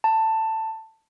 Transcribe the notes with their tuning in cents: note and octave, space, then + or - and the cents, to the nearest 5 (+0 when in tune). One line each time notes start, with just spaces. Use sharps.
A5 +15